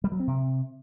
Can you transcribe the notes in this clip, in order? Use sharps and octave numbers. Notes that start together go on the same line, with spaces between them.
G3
F#3
C4
C3